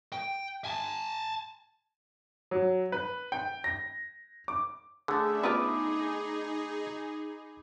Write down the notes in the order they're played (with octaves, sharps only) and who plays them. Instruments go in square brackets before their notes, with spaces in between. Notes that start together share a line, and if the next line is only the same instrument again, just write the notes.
[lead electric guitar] G5
G#5 A5
[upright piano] F#3
B4
G5
A#6
D6
[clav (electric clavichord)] D3 A3 [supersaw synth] C#4 D4 E5 [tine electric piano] G#4
[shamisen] B3 F4 B4 [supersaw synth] D#4 G#4 [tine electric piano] B5 D6 D#6